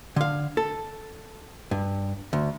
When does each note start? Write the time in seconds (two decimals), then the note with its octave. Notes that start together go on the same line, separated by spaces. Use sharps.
0.16 D3 F5
0.57 A4
1.71 G2
2.33 D2